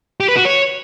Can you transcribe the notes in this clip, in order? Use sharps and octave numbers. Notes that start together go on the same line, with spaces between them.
G4
B4
F#4
C#5